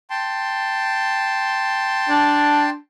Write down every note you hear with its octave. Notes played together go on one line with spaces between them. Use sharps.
G5 A5 C6
D4